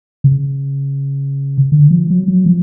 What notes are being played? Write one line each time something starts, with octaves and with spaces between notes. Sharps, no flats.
C#3
D3
F3
F#3
F#3
F3